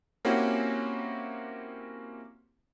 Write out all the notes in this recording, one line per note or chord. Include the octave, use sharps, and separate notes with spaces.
A#3 C4 C#4 E4 F#4 G4